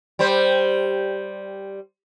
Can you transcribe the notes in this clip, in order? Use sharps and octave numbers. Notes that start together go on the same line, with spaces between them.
G3 C5